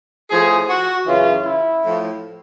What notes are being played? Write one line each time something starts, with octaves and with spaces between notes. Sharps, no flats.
A2 F3 G#4
F#4
F#2 C#3 E3 F4
E4
A2 F3